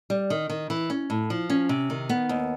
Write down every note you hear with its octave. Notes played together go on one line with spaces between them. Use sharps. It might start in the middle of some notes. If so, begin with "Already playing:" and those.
G3
D#3
D#3
E3
C#4
A2
F3
C#4
C3
D#3
B3
D#2